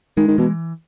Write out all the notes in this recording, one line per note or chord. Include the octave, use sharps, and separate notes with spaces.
D#3 G#3
D#3
B2 E3